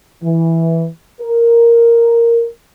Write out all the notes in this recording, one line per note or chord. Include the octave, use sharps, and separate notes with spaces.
E3
A#4